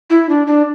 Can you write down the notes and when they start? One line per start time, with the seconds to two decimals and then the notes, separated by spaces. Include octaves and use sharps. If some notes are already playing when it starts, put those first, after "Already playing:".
0.10 E4
0.29 D4
0.47 D4